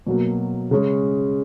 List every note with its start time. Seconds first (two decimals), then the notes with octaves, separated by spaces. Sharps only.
0.07 B2 F#3 A#3
0.71 C#3 G#3 C#4